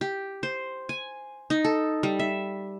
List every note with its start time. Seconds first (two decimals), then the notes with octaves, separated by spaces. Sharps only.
0.01 G4
0.43 C5
0.89 G#5
1.50 D#4
1.65 A4
2.03 G3
2.19 E5